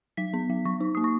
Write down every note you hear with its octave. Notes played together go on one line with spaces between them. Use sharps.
F#3 B6
B3
F#3
F#3 C#6
D#4
A#3 D#6
C#6